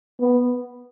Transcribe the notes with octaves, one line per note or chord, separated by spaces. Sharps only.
B3